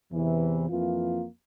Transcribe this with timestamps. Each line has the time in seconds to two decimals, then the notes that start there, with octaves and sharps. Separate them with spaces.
0.11 E2 C3 E3
0.68 F2 E3 A#3 F4